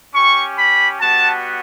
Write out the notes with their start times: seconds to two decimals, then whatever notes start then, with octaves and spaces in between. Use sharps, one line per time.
0.15 C#4 G4 C#6
0.57 B5
1.00 G3 B3 F#4 A5